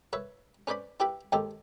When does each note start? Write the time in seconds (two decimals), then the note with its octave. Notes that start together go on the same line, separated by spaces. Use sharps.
0.13 B4 C#5 E5
0.67 C#4 B4 C5 D5 B5
1.00 E4 G4 B4 G5 B5
1.32 D#2 G#2 D#3 G4 A4